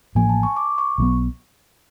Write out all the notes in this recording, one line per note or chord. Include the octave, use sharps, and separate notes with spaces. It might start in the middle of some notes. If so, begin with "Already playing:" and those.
A1 A2 F3 A#3 G#5
A5
C#6
D6
C#6
B1 B2 F#3 B3